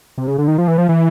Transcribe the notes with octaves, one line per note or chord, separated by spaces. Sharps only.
C3
C#3
D3
D#3
F3
E3
F3
E3